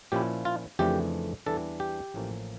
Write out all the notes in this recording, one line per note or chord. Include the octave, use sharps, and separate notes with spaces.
A#2 F3 C#4 E4 G4
F4
F2 C#3 E3 A3 D4 G4
E2 E3 G3 D4 A4
G4
A1 A2 F3 A#3 C#4